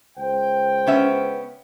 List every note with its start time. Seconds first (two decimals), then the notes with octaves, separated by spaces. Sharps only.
0.18 C#2 C5 G5
0.87 B3 C#4 E5